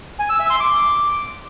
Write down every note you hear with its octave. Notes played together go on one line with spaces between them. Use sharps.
G#5
E6
E5
C6
D6